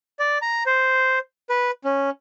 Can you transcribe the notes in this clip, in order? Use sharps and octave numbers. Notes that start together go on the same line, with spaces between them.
D5
A#5
C5
B4
C#4